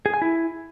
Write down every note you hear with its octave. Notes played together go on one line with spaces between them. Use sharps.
G#4
G#5
E4